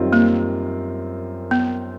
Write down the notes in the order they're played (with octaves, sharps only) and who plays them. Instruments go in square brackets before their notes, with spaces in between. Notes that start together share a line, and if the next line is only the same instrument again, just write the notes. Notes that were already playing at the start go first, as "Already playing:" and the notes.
Already playing: [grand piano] F#2 D#3 G3 C4 F4
[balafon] A#3
B3